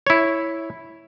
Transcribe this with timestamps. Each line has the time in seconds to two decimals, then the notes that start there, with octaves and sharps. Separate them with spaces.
0.07 E4 C#5